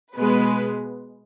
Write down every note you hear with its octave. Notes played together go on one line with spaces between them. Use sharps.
B2 G#3 B3 B4